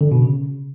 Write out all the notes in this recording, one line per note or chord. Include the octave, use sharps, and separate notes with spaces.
D3
B2
C#3